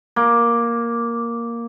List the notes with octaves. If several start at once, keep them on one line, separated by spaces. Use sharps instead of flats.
A#3